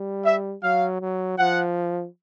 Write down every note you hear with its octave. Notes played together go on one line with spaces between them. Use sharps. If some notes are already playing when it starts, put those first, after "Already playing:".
Already playing: G3
E5
F#3 F5
F#3
F3 F#5